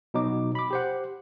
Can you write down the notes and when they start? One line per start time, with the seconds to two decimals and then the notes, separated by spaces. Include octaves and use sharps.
0.14 B2 F#3 D#4 D6
0.55 B5 D6
0.71 G4 C5 F#5